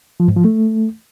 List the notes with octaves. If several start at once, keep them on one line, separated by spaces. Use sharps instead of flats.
F3
G#2
F3
A3